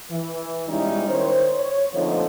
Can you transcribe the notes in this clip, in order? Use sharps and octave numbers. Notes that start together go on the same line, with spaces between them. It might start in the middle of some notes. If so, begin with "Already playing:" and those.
E3
B2 G3 G#3 C#4 D#4 E4
D#3 C5 C#5
C#5
A#2 D3 F3 A3 C4 D#4